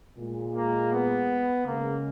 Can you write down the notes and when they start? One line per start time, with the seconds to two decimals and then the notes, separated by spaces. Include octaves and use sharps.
0.18 A#2 G#3
0.54 A#3
0.92 B3
1.66 C#3 G#3 A#3